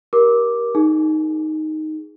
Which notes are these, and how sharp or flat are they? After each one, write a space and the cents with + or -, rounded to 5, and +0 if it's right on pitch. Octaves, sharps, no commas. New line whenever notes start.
G4 -10 A#4 +20 D6 +0
D#4 +0 G#4 +0